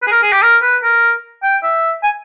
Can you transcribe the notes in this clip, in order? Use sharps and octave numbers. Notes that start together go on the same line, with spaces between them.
B4
G#4
A#4
G#4
G4
A#4
B4
A#4
G5
E5
G#5